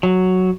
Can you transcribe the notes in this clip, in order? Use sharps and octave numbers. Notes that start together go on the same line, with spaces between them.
F#3